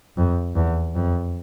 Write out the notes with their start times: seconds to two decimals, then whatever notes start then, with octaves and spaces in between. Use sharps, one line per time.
0.17 F2
0.55 E2
0.95 F2